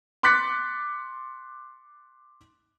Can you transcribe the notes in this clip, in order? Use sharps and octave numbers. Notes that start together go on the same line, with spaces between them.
C6 D6 F#6 A6 B6 C#7